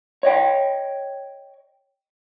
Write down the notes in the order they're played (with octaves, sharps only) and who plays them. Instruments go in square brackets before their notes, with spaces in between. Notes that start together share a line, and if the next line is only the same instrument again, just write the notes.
[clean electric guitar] C#5 D#5 G5